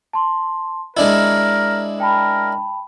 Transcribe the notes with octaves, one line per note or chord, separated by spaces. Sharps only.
A5 C6
G#3 D4 E4 A#4 D#5
A#4 G5 A5 B5